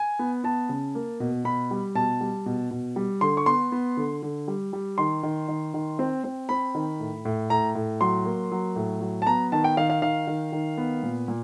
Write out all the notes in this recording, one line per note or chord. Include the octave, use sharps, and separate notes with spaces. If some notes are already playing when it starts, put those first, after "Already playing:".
Already playing: G#5
B3
B3 A5
C#3
A#3
B2
B2 B5
G3
B2 A5
G3
B2
B2
G3
D3 C6
C#6
B3 C6
B3
D3
D3
G3
G3
D#3 C6
D#3
D#3
D#3
C4
C4
C4 B5
D#3
A2
A2
A2 A#5
A2
F#3 C6
A#3
F#3
A2
F#3
A5
B3 A#5
D#3 A5
G5
D#3 F5
F5
D#3 F5
D#3
D#3
B3
A#2
A#2